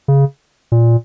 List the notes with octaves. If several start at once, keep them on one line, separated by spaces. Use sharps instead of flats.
C#3
A#2